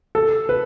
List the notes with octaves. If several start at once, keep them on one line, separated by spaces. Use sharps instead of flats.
A4
B4